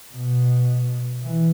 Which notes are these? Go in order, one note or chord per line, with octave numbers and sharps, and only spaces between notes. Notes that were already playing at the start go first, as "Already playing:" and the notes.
B2
E3